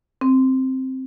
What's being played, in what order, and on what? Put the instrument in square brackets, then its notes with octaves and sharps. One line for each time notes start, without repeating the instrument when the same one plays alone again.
[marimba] C4